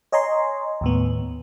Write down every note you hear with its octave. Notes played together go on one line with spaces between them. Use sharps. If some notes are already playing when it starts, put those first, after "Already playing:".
C#5 D#5 G#5 A#5 C6
D#2 A2 B3